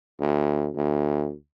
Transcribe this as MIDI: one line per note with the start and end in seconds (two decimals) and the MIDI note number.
0.20 0.70 38
0.75 1.34 38